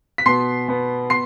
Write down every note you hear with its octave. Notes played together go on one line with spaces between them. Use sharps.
B6
B2 B3 C6 C7
B2 B3
B3 C6 C7